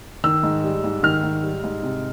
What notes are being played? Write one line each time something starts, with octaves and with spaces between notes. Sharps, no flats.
D#3 E6
G#2
G3
G#2
D#3 F6
G#2
G3
G#2
C3